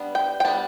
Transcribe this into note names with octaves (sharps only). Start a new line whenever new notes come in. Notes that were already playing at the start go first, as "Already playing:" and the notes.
Already playing: G3 B3 D4
G5
G5
G3 B3 D4 A5